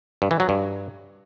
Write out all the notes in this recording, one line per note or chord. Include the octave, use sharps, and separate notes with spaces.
G2
E3
F#3
G2